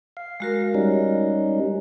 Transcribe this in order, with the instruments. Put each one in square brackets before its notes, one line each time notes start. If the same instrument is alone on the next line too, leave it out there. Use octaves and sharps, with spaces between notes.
[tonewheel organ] F5
[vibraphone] G#3 F#4 A#4
[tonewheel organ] G3 C#4 D#4